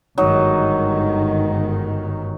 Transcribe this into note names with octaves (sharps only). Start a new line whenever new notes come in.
G1 G#2 D#3 F#3 D#4